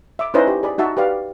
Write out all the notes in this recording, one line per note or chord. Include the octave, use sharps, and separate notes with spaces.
E5 D6
C#4 D#4 E4 B4 C5 D#5
G4
G#4 D5 B5
D#4 F#4 E5 A5
G4 B4 D5 F5